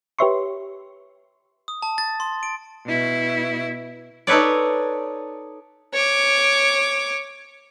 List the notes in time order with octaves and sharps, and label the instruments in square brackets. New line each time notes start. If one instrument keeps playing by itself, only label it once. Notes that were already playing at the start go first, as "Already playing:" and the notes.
[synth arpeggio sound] G4 B4 C#5 E5 C6 C#6
[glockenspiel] D#6
A5
A6
C6
D7
[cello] B2 E4
[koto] D#4 A4 B4 C#5 D5
[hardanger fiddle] C#5 D6